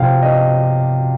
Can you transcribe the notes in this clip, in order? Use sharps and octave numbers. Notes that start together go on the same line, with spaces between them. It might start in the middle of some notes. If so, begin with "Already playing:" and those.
Already playing: C3 F3 F5 G5
D#5